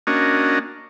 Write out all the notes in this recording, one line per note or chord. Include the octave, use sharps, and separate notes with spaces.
A#3 C#4 D4 F#4 D#5